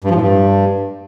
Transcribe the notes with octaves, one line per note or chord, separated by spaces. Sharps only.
G2
F3
A2
G2